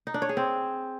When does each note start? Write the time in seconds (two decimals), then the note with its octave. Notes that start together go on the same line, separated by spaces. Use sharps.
0.07 D#4
0.14 D4
0.22 C#5
0.29 G#4
0.37 C4